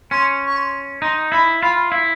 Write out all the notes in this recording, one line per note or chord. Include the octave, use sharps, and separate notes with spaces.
C#4 C6
C#6
C6
D#4 C6
E4 B5
F4 B5
E4